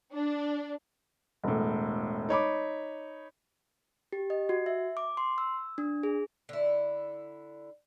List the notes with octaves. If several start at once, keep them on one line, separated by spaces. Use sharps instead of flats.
D4
E1 A2
D#4 C#5 B5 D6
G4
D#5
F#4
E5
D6
C6
E6
D4
G#4
D3 E4